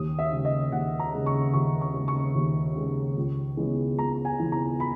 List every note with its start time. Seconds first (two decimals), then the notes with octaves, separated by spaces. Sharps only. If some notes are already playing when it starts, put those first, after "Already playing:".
Already playing: D#2 D#6
0.19 E5
0.32 C#3 G#3
0.45 D#5
0.72 D#2 F#5
0.99 A#5
1.13 C#3 G#3
1.26 C#6
1.53 D#2 C#6
1.81 C#6
1.94 C#3 G#3
2.08 C#6
2.35 D#2
2.76 C#3 G#3
3.17 C#2
3.57 C#3 E3 G#3 B3
3.98 C#2 A#5
4.25 G#5
4.38 C#3 E3 G#3 B3
4.52 A#5
4.80 B5